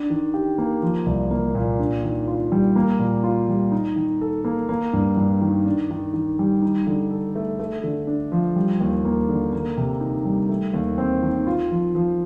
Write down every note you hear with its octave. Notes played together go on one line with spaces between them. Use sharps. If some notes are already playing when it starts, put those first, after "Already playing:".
Already playing: D4
D#3
G4
A#3
F3
C2
A#3
A#2
D4
D#3
F4
G3
A#3
A#2
F4
G3
D#4
D#3
A4
A#3
A#3
G2
G2
D#3
D4
D#3
D#3
G3
D#4
D3
A4
A3
A3
D3
D4
F3
G3
D#2
A#3
D3
A#3
C3
D#4
G3
A3
D#2
C4
D#3
F4
F3
F3